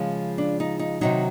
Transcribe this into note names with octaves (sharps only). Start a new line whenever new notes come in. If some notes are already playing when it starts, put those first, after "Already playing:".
Already playing: C#3 F3 G#3
D4
D#4
D#4
C3 D#3 F#3 D#4